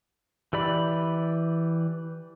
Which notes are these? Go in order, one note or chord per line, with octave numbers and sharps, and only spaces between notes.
E3 G4 D5 B5